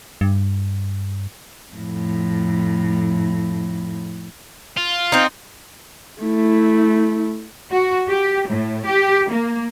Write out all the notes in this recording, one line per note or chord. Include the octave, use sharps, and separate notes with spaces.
G2
F2 A2
F4
C4 D#4
A3 E4
F#4
G4
A2
G4
A#3